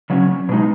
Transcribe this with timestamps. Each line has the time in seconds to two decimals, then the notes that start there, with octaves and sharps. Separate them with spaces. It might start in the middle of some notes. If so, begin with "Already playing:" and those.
0.10 C#3 F#3 C#4
0.49 B2 G#3 D#4